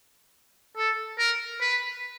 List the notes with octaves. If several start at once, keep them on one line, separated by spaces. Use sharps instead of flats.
A4
A#4
B4